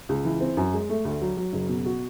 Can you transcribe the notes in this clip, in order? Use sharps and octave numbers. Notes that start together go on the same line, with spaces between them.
C#2
E3
C4
F#2
G#3
A3
D2
F#3
F#3
F#1
B2
F#4